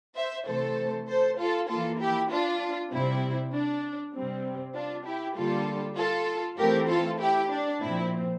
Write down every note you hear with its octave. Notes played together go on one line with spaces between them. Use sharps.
C5 E5
C3 E3 A3 A4 C5
A4 C5
F4 A4
E3 A#3 F4 A4
E4 G4
D4 F4
C3 G3 C4 E4
D4
C3 G3 C4
D4 F4
E4 G4
D3 G3 A#3 F4 A4
F4 A4
E3 A3 C4 G4 A#4
F4 A4
E4 G4
D4
A#2 F3 C4 E4